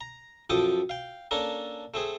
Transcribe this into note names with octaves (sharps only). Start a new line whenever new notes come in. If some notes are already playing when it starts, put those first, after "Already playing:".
A#5
F#2 F3 A4 G5 D6 D#6
F5 G5
A#3 C#4 D4 A4 A#4
A3 C4 G#4